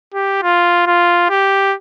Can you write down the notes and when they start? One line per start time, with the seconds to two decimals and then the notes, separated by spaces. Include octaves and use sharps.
0.14 G4
0.42 F4
0.87 F4
1.30 G4